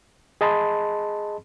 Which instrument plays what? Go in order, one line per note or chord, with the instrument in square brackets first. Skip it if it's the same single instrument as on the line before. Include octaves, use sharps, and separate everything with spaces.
[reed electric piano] G#4 D#5 A5 B5 C6